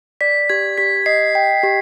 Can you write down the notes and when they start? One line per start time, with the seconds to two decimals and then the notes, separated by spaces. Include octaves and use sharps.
0.21 D5 B6
0.50 G4 G#6
0.78 G4 B6
1.06 D#5 C7
1.35 G5
1.63 G4